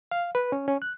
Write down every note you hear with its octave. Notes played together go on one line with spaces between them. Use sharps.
F5
B4
C#4
C#4
F#6